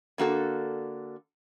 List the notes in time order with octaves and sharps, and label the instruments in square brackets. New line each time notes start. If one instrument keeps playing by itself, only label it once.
[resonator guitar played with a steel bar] D3 A#3 F#4 A4